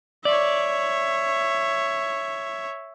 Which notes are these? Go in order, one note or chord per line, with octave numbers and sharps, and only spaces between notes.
C#5 D5 E5